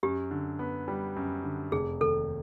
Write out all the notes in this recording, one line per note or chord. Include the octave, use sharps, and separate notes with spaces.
F#2 G4
D3
B3
G3
F#2
D3
F1 G#4
D#2 A4